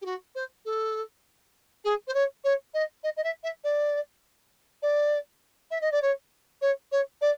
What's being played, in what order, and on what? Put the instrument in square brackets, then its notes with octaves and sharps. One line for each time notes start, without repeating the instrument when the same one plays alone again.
[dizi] G4
F#4
C5
A4
G#4
C5
C#5
C#5
D#5
D#5
D#5
E5
E5
D5
D5
E5
D#5
D5
C#5
C#5
C#5
D5